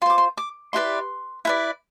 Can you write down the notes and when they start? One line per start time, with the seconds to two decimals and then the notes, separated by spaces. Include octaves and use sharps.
0.02 F4 C6
0.06 C5 D6
0.18 C6
0.37 D6
0.73 E4 G4 B4 D5 C6
1.45 E4 B4 D5